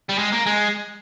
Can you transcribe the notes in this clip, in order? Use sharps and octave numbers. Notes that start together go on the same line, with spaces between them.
G3
G#3
A#3
G#3